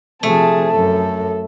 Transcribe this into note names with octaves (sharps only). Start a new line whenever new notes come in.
C3 F3 A3 G#4 A5
F#2 A4